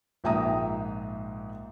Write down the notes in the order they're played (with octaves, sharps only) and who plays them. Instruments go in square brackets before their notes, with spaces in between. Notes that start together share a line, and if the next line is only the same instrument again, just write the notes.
[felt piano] A#1 G#2 E5 G5 A#5 D#6